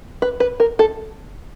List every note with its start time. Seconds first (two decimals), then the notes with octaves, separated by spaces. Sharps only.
0.22 B4
0.40 B4
0.60 A#4
0.79 A4